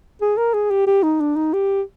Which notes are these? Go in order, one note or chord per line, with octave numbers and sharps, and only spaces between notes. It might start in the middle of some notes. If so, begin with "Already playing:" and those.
G#4
A#4
G#4
G4
G4
D#4
D4
D#4
G4